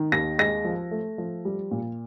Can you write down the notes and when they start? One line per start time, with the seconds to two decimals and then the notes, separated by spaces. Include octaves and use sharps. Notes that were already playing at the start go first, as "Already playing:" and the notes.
Already playing: D#3
0.12 D#2 A#6
0.39 G#3 A#6
0.64 F3
0.91 A3
1.18 F3
1.45 G3
1.71 A#2